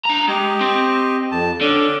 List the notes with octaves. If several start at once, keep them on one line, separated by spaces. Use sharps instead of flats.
D4 A#5
G#3 G4 D#5
C4
F2 A5
D3 C#4 D5